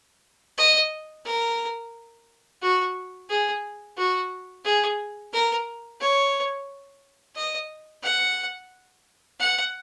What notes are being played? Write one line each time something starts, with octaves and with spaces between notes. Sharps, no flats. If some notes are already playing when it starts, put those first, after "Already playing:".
D#5
A#4
F#4
G#4
F#4
G#4
A#4
C#5
D#5
F#5
F#5